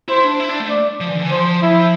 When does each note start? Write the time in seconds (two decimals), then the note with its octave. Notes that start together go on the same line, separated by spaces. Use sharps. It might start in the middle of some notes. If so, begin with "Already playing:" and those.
0.08 E4 C5
0.24 D4
0.40 E4
0.49 D4
0.60 A3
0.70 D5
1.00 F3
1.08 E3
1.16 D3
1.23 E3
1.31 F3 C5
1.62 F3 E4